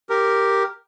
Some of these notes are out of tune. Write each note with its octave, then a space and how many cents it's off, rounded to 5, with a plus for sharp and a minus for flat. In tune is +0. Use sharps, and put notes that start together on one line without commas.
G4 +0 A#4 -5